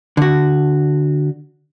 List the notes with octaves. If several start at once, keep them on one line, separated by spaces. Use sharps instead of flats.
D3 F#4